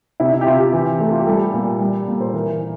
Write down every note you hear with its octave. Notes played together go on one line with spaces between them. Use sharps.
C3 E4
E4
G4
C3 F4
G4
E3
A3
F4
G4
G3 A4
A#2
G3
A#2
C5
E3 A#4
E3